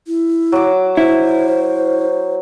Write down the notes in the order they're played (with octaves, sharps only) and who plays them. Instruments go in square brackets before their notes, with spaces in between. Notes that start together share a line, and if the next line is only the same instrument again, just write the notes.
[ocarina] E4
[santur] F#3 D6
[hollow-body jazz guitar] E4 [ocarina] C5